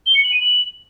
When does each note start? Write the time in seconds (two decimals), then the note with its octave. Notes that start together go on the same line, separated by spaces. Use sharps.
0.06 G7
0.15 C#7
0.23 F#7
0.32 D#7
0.41 F#7